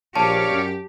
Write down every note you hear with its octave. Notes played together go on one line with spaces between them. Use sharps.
A#1 G4 C#5 D5 F5 A5
F#2